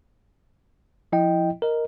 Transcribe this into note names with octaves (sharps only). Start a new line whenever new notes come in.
F3 E4 D#5 G5
A#4 D#5